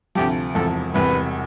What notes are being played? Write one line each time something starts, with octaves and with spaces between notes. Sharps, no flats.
D2 C3 F3 G4
E1 E2 C3 F3 A4
E1 E2 C3 G3 B4